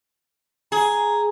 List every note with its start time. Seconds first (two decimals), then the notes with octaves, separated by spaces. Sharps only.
0.72 G#4 A#5